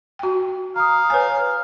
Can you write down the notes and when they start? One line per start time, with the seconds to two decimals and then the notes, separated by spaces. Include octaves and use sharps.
0.19 F#4 G5
0.76 F5 A#5 D#6
1.10 B4 C#5 G#5